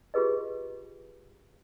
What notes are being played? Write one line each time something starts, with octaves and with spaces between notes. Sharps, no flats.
F4 G4 G#4 B4 D#5